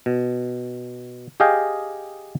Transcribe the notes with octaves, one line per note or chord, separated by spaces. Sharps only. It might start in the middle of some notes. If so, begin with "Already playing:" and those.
B2
G4 G#4 D#5 F5 G5 G#5